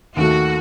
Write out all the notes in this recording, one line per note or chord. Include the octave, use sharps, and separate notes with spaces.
D#2 D#3 A3 F#4